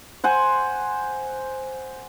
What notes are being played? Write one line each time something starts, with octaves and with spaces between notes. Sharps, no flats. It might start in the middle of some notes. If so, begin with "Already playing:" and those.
C5 F#5 G#5